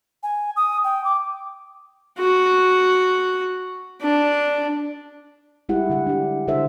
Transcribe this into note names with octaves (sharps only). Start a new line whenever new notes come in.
G#5
D#6
G5
D6
F#4
D4
G3 G#3 E4 G4 F#5
D3 F#5
D4 G4
D3 E4 A4 C5 E5